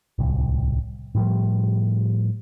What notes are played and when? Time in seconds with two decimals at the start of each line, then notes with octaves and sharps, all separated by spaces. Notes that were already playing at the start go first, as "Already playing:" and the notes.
0.19 D1 C2
1.15 A2 F3 G3